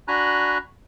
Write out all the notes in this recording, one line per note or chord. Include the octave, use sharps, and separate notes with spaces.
D4 F#4 G#5 A#5 B5 F#6